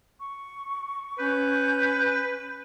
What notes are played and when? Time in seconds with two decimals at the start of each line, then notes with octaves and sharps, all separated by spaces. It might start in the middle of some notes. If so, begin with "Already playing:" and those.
0.20 C#6
1.18 C#4 B4 G6